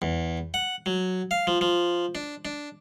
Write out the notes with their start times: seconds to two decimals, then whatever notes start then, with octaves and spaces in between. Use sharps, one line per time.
0.02 E2
0.54 F#5
0.86 F#3
1.31 F5
1.47 F3
1.61 F3
2.15 D4
2.45 D4